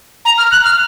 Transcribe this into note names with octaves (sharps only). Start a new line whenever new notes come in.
A#5
F6
F#6
F6